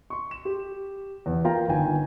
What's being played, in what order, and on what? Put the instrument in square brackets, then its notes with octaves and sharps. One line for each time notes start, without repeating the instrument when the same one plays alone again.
[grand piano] C6 C#6
E7
G4
E2
A#3 F4 G5 A#5
G1 D#3 G5 G#5